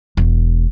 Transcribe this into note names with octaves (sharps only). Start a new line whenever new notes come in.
E1